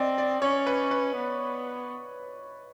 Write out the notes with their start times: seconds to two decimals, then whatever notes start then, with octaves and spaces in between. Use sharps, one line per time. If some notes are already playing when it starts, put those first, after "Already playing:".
Already playing: C4 D5 D#5
0.18 D5
0.42 C#4 C#5
0.67 B4
0.91 B4
1.15 B3